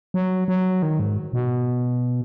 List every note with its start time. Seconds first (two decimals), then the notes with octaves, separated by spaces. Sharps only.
0.14 F#3
0.48 F#3
0.83 D#3
1.00 G#2
1.33 B2